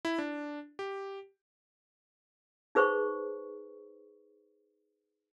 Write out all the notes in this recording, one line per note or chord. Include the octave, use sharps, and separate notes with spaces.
E4
D4
G4
D#4 G#4 B4 C5 C#6